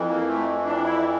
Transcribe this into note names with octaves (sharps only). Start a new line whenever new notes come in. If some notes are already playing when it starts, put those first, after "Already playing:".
Already playing: F2 E3
A#3
A3
D4
E4